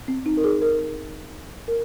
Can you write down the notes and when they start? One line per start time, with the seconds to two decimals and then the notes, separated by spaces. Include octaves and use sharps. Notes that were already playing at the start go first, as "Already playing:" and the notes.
0.08 C4
0.26 D#4
0.37 A#4
0.44 G#4
0.62 A#4
1.68 A#4